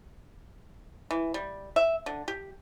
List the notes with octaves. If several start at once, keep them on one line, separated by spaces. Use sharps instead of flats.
E3
G3
E5
D3
G4